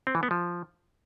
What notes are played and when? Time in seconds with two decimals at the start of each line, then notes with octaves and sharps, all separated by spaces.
0.07 C4
0.15 E3
0.23 B3
0.31 F3